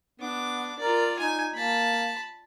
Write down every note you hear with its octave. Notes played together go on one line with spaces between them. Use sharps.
B3 D4 D6
F4 A#4 D5
D#4 G#5
A#3 A5 B5